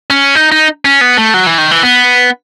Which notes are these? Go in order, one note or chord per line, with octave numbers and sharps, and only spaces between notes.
C#4
D#4
D#4
C#4
B3
A3
F#3
E3
D#3
E3
B3